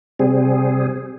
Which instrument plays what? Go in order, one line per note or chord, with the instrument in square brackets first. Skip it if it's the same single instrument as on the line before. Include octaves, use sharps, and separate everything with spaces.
[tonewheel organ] C3 G3 C4 G#4